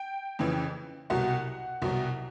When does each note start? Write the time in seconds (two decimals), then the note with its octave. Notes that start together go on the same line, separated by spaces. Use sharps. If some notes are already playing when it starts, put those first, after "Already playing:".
Already playing: G5
0.39 F2 C#3 E3
1.10 C2 B2 F#3 F#5
1.82 C2 B2 F#3